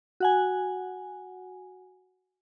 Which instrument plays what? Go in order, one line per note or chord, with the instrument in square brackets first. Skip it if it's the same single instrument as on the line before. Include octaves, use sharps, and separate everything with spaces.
[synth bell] F#4 F#5 G#5